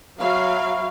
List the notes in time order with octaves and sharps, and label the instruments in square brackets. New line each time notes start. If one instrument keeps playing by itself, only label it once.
[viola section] F#3 F5 [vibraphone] E5 B5 C#6